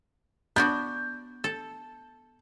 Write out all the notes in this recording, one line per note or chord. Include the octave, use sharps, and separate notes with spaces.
B3 D4 F#4 G6
A4